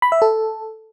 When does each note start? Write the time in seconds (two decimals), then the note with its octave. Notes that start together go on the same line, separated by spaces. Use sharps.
0.02 B5
0.12 E5
0.22 A4